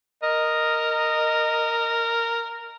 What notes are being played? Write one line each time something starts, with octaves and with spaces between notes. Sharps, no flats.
A#4 D#5